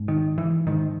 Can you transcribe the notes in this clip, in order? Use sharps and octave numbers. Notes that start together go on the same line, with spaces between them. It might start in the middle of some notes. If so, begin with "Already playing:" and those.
Already playing: G#2
D#3
E3
G#2 D#3